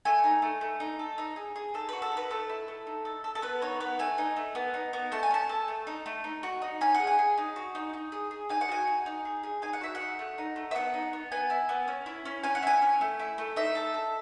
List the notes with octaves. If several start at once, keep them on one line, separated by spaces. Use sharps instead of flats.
A3 G#5
D#4
A3
A3
D#4
A4
D#4
G#4
G#4
D#4 A4
F#4 B4
A4
D#4
B4
A3 A4
E4
A3
D#4
A4
A4
A4
B3 B4
D#4 C#5
B3 B4
A3 G#5
D#4
A3
B3
D#4
B3
A3 A5
G#5
C#4 A5
A4
A3
D#4
A3
D#4
F#4
D#4
C#4 G#5
F#5
G#4
G#5
G#4
D#4
F#4
D#4
D#4
G#4
G#4
D#4 G#5
F#5
F#4 G#5
D#4
D#4
G#4
G#4
D#4 G#5
F#5
F#4 E5
F#5
D#4
A3
D#4
A3
E5
B3 F#5
D#4
B3
B3 G#5
E4
B3
C#4
E4
C#4
C#4 G#5
F#5
E4 G#5
C#4
A3
E4
A3
D#4 E5
A4
A4